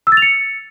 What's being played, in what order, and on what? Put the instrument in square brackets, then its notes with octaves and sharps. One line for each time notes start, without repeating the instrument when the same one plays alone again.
[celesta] E6
A6
F7
C#7